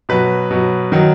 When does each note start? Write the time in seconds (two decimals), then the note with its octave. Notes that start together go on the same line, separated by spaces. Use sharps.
0.09 B2 F#3 B4 B5
0.51 B2 F#3
0.92 D#3 F#3